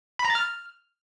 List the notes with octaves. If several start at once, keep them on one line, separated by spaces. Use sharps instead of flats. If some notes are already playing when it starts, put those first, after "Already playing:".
B5
A#5
A6
F6